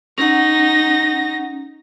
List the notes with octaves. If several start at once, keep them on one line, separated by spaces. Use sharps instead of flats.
C#4 D#4 F#5 A#6